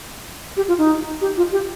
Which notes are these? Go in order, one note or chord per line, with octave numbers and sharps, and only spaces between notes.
G4
F4
D#4
G4
F4
G4